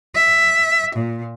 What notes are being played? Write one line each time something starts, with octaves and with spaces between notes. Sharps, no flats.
E5
A#2